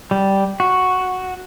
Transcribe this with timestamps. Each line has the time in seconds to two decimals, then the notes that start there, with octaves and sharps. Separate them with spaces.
0.11 G3
0.60 F#4